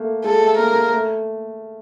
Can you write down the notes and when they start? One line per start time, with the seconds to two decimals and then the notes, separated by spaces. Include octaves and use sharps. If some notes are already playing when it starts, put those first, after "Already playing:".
Already playing: A3 A#3
0.24 G#3 A4
0.41 A3
0.58 A#3 A#4
0.74 A#3
0.92 A3